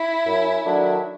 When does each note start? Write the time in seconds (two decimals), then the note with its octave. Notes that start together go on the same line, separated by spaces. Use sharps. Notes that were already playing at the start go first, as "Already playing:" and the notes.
Already playing: E4
0.26 F#2
0.66 D#3 F#3 A3 D4